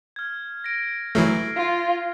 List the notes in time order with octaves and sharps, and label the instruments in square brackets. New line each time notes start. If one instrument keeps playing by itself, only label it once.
[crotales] F6 G#6
A#6 D7
[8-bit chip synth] E3 F#3 A3 [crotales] F6 C7
[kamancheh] F4